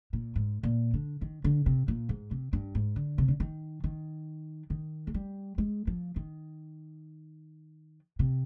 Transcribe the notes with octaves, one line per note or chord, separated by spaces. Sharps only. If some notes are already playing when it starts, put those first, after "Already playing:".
A#2
G#2
A#2
D3
D#3
D3
C3
A#2
G#2
C3
G2
G#2
D3
C3
D3
D#3
D#3
D#3
G#3
G3
G#3
F3
D#3
C3